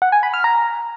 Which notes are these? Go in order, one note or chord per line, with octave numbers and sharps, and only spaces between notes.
F#5
G#5
B5
F6
A#5